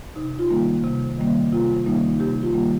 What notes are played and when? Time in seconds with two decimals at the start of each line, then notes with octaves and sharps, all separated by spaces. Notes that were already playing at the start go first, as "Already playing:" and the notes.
0.16 C3 D#4
0.39 F4
0.50 D#3 G3 A#3
0.84 C3
1.18 D#3 G3 A#3
1.52 C3 F4
1.86 D#3 G3 A#3 D#4
2.20 C3 G4
2.43 F4
2.54 D#3 G3 A#3